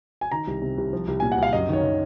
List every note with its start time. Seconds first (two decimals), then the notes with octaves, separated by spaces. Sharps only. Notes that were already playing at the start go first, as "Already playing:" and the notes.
0.21 G#5
0.32 D#3 A#5
0.47 C2
0.62 C3
0.78 C2
0.93 F3
1.08 C2
1.20 A#2 G#5
1.32 F#5
1.38 C2 F5
1.53 F#2 D#5
1.69 D#3 C#5
1.83 D#3